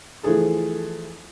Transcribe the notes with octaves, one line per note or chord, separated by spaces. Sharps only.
E3 F3 A3 G#4 A4